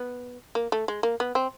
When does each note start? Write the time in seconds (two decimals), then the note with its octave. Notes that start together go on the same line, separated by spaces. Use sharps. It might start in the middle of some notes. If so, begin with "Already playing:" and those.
Already playing: B3
0.55 A#3
0.72 A3
0.88 G#3
1.03 A#3
1.20 B3
1.35 C4